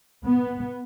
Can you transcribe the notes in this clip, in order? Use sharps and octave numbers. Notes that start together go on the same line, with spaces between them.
B3